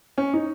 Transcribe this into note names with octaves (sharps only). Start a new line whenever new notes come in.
C#4
D#4